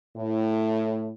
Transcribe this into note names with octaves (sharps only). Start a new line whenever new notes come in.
A2